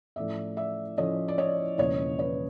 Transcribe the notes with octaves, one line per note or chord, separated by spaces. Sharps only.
A2 F3 A3 C#4 D5 E5
D5 E5
A2 F3 A3 C#4 C#5 D#5
D5
C#5 D#5
E1 E2 C#3 F3 A#3 C#5 D#5
B4 C#5